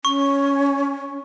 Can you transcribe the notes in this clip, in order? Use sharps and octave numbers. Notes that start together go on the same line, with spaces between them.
C#4 C#6